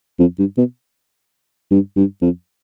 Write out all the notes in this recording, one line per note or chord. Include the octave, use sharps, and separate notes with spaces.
F2
G2
B2
G2
G2
F2